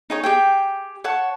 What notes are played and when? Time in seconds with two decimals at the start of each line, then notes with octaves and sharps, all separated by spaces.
0.10 D#4 G#4 C#5
0.23 G4 G#4 G5
1.04 C#5 F#5 A5 C#6